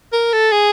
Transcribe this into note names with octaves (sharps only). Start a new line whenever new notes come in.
A#4
A4
G#4